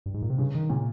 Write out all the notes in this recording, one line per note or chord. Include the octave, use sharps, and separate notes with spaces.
G2
G#2
A#2
C3
G2 C#3
D#3
A#2 C#3